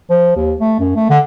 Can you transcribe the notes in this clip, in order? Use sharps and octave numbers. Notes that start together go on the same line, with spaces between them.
F3
D#2
A3
F#2
A3
D3